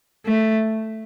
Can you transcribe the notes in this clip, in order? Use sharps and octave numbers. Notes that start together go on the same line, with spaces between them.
A3